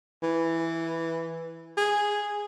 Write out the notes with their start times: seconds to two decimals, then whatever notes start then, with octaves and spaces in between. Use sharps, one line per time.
0.23 E3
1.77 G#4